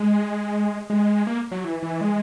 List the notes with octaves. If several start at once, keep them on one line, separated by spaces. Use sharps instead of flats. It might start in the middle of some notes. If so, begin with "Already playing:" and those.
Already playing: G#3
G#3
A#3
F#3
E3
E3
G#3